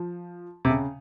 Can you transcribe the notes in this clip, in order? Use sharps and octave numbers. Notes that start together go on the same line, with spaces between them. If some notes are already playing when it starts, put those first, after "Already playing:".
Already playing: F3
C3
C#3